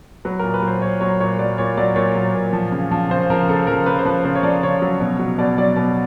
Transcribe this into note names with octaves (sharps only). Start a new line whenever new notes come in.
F#3 B4
A#2 A#4
B4
F#3 C5
A#2 C#5
F#3 C#5
A#2 C#5
F#3 D5
A#2 C#5
F#3 D5
A#2 C#5
F#3
A#2
F3
C#3
F3
C#3 C5
F3 A#4
C#3 A4
F3 A#4
C#3 B4
C5
F3 B4
C#3 C5
C#5
F3 D5
C#3 C#5
F#3
B2
F#3
B2 D5
F#3 D5
B2 D5